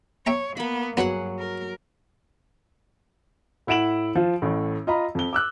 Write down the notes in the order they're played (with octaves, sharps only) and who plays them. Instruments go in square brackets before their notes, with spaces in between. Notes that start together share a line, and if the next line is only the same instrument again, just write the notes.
[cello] C#5 [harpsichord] E5 G5 A#5
[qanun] A#3 B5 [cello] B3
[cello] G2 [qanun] F#3 G#4 F#5 [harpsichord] B3 B4 C#5
[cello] A#4
[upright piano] A2 E4 F#5 D7 E7 F#7
F3 F4
A1 A2
F4 D#5 A#5 B5
F2 G7
D6 E6 F#6